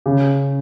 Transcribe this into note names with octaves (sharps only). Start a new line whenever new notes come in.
C#3